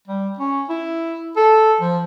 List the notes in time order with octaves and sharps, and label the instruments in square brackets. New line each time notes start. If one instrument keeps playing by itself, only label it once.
[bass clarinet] G3
C#4
E4
A4
F3